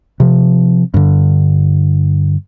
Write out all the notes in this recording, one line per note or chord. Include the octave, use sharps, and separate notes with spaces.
C3 F3
G2 D3